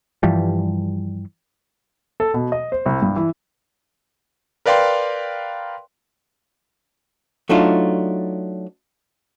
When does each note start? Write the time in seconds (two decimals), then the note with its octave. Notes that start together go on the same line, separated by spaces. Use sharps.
0.23 G2 E3 F3 G3
2.20 A4
2.34 B2
2.52 D#5
2.72 C5
2.86 C2
3.02 G2
3.16 E3
4.66 A#4 B4 D5 F5 G5 C6
7.49 F#3 A3 D4 D#4 F4